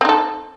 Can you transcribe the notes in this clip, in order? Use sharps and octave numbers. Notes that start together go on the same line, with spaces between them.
C4 D#4 A4